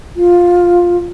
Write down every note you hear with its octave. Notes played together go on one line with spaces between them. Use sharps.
F4